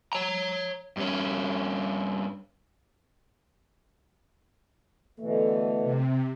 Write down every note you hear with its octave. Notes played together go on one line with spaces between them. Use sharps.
C#5 A#5
G2 C#4
B2 D3 E3 A3
C3